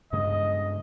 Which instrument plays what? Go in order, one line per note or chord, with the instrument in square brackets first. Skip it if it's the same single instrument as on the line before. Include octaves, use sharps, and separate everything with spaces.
[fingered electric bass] G2 C#3 G#3 [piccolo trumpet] D#5